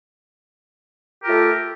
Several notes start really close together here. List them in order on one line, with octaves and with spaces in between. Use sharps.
G4 A#4 F4 A3